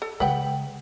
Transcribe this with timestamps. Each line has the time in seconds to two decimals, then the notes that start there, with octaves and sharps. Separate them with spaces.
0.02 A4
0.20 C#3 G#3 B4 F#5 G5